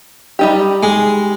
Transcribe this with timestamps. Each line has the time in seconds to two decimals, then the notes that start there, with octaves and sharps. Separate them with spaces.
0.39 G3 D#4 G4
0.83 G#3